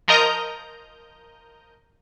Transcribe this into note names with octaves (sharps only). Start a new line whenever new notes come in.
F3 A#4 D#5 A#5 G6